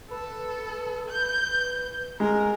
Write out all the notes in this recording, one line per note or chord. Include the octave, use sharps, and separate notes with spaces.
A4 B4
G6
G#3 A#4